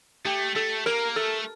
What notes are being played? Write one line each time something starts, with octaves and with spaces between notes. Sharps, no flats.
A3 G4
A3 A4
A#3 A#4
A3 A4